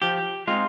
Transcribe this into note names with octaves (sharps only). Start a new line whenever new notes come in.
F3 G4
G#3 C4 D#4 F4